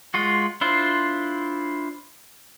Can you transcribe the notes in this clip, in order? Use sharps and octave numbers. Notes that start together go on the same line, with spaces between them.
G#3 F4 F#4
D4 E4 F4 C5